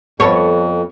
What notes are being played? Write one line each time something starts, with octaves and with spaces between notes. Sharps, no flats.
F2 B3 A4 C#5